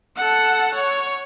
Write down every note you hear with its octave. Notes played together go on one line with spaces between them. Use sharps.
A4 F#5
C#5